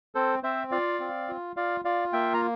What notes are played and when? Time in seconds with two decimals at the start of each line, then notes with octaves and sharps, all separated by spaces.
0.15 C4 A4 C5
0.43 C4 C5 E5
0.72 F4 D5 F5
1.00 C4
1.29 F4
1.56 F4 D5 F5
1.85 F4 D5 F5
2.13 A#3 E5 G5
2.34 A#5